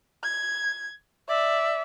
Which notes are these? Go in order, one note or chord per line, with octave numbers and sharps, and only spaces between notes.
G#6
D5 E5